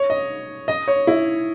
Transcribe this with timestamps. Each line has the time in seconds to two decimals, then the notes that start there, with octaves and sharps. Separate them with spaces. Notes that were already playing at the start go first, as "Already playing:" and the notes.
Already playing: C#5
0.10 D#5
0.68 D#5
0.88 C#5
1.07 E4